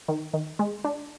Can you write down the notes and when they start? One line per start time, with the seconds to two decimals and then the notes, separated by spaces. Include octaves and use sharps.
0.08 D#3
0.34 D#3
0.59 G#3
0.84 D4